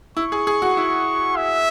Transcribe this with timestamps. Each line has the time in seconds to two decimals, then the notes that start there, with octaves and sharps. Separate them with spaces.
0.17 E4 C#6
0.32 G#4
0.47 G#4
0.62 F#4
0.77 E4
1.36 E5